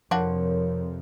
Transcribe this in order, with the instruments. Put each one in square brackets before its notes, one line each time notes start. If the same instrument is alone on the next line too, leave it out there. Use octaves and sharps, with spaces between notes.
[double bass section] F2 C3 [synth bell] F3 [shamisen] D4 F4 F#4 [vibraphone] A#4 C#5